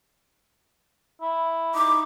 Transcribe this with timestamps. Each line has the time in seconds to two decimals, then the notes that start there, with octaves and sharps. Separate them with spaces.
1.21 E4
1.75 D#4 D6